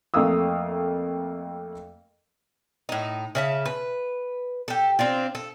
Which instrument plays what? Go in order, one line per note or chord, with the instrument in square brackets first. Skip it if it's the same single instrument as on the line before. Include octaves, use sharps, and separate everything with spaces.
[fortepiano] F2 A3 A#3 F5 D#6 E6
[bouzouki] A2 D#4
C#3 E5 A5
B4
G4 A4
C4 D4 F4
A4